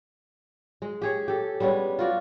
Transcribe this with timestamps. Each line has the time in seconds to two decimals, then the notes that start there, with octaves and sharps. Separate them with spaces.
0.82 G#3
1.02 G4 G#4 C#5
1.28 G4 A4
1.60 G3 G#3 B3 C#4
1.99 F4 F#4 D5